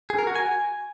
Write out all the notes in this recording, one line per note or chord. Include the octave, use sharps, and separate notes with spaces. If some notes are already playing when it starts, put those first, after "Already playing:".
G#4
A#4
F#4
G#5